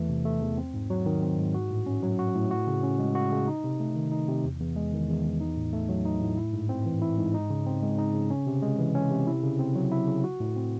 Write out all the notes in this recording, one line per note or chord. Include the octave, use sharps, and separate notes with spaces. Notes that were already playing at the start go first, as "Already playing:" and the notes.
Already playing: E2 E3 A3
C3
A3
E2
C4
G#2
F#3
D#3
C4
G#2
F#4
A2
C#4
F#3
F#4
A2
F#4
C#3
C#4
G#3
F#4
C#3
D#4
C3
A3
D#3
D#4
C3
E2
E2
G#3
D#3
E2
E2
D#4
A2
A3
F#3
D#4
A2
E4
G#2
C4
E3
E4
G#2
D#4
C#3
C4
G#3
D#4
C#3
C#4
C3
G#3
E3
C#4
C3
E4
C#3
C4
F#3
E4
C#3
F#4
A2
C4